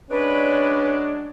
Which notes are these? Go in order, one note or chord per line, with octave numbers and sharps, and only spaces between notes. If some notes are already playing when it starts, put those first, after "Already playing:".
F#3 G#3 C#4 D4 B4